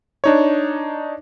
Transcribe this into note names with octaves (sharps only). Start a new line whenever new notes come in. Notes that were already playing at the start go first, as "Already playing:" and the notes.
D4 D#4 C#5